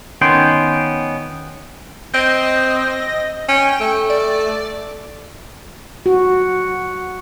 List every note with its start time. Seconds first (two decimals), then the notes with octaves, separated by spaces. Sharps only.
0.21 D#3 B3 C#4 G5 C6
2.14 C4 D#5
3.49 C#4 G5
3.81 A3
4.10 D5
6.06 F#4